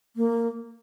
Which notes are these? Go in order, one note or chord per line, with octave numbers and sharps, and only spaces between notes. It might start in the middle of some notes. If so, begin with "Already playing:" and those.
A#3